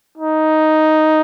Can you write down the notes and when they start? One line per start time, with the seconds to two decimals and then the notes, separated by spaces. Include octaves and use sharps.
0.18 D#4